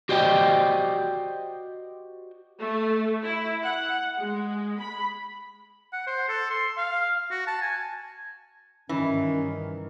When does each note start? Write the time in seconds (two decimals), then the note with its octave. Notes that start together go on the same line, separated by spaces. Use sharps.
0.09 F#4 G4 C5 D5 D#5 G5
2.60 A3
3.23 E4
3.62 F#5
4.18 G#3
4.79 B5
5.93 F#5
6.07 C5
6.29 A4
6.50 C6
6.77 F5
7.31 F#4
7.47 A5
7.62 G#5
8.89 G2 D#3 E3 C#4